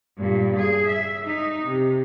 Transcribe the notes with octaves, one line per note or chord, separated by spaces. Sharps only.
G2 A#2
G#4
E5
D#4
C3